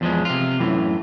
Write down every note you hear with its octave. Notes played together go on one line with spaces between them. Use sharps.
E2 F3 G#3
C3 F4
F#2 A2 E3